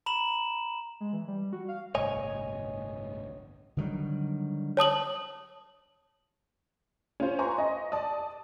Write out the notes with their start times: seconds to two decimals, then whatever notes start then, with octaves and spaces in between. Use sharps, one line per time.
0.06 A#5 B5 E7 F#7
1.00 G#3
1.13 E3
1.28 G3
1.53 F#4
1.68 F5
1.95 G1 C2 A2 C#5 D#5 G#5
3.77 D3 D#3 F#3 G3
4.77 C#5 A5 D#6 F#7
7.20 C#4 F4 C5
7.39 B4 G#5 A#5 C6 C#6
7.58 D#5
7.92 D5 A5 D#6